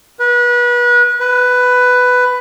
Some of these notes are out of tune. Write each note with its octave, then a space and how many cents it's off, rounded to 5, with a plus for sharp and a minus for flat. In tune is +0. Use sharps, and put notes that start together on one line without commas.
B4 -30
B4 +10